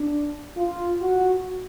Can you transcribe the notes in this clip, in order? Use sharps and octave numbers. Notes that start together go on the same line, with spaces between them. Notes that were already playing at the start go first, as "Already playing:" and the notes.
Already playing: D4
F4
F#4